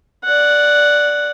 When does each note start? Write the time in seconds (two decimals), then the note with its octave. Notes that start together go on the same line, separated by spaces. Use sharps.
0.25 D5 F#5